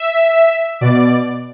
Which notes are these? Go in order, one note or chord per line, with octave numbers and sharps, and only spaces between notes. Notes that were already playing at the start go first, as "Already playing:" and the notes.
Already playing: E5
B2 D5